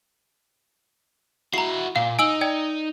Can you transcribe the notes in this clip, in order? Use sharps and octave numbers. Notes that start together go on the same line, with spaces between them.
E4 F#4 A#5 C7
A#2 F5
D#4 G#5 E6 F#7
D5 G5 G#6